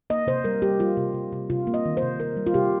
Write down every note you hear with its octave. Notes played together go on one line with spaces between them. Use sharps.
A#3 D#5
C3 C5
G3 A#4
G3 G4
G3 F4
C3
C3
C3
C3 F4
A#3
D#5
D#3
C5
C3
C3 A#4
G3
F4
C3 G4